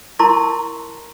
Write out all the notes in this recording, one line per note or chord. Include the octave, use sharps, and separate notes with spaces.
E4 A#4 A5 A#5 C6 C#6